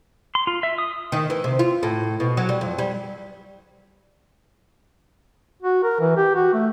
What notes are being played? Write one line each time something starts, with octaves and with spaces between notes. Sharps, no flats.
C6
F4
E5
D#6
D#3
E3
C3
F4
A2
B2
F#3
G3
F2
G3
F#4
A#4
E3
G4
F#4
A3